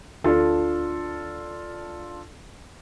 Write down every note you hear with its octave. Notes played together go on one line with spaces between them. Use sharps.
D2 D4 F4 A4